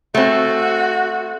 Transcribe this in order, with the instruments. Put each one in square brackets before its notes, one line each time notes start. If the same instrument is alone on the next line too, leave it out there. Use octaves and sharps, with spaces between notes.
[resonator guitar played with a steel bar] A3 C4 [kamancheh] F#4